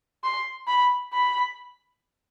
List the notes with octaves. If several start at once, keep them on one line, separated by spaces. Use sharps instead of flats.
C6
B5
B5